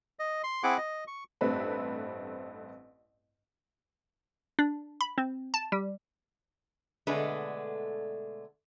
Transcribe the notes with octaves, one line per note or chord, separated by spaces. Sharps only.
D#5
C6
C4 E4 G#4 F#5 D6
D#5
C#6
A1 G2 A3 C4 B4 B5
D4
B5
C4
A5
G3
B2 D3 G#3 A3 D4 B4